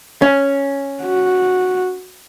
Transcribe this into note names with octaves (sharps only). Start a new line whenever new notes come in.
C#4
F#4